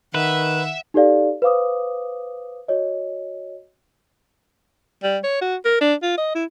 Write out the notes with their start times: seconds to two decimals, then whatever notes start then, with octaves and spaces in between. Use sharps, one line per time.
0.14 D#3 B4 E5 F#5
0.94 D#4 G4 A4 D5 F5
1.42 B4 C5 F5 D6 D#6
2.68 F#4 C#5 D#5
5.03 G3
5.24 C#5
5.41 F#4
5.65 A#4
5.81 D4
6.02 F4
6.18 D#5
6.35 E4